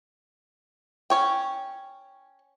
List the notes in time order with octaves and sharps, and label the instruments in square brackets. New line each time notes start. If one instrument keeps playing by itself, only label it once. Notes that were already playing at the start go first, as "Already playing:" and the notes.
[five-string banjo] C#4 C#5 G5